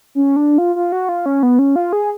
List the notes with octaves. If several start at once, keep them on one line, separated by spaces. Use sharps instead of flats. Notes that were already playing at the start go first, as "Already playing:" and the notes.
C#4
D4
F4
F4
F#4
F4
C#4
B3
C#4
F4
G#4